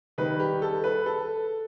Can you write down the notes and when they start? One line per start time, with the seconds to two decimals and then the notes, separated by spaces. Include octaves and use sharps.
0.18 D#3 G3 B4
0.40 G4
0.62 A4
0.84 B4
1.06 A4